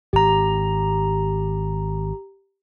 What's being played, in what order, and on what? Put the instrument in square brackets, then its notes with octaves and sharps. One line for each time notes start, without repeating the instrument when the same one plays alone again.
[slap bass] G#1 [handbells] G4 A#5